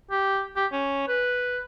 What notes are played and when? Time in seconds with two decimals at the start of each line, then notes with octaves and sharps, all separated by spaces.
0.11 G4
0.56 G4
0.72 C#4
1.08 B4